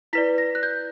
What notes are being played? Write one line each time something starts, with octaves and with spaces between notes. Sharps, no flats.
E4 B4 D5 B6
A#6
F#6
G6